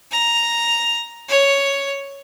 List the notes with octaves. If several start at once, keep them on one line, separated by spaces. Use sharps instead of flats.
A#5
C#5